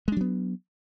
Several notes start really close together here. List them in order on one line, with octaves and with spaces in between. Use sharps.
G#3 D4 F#3 B3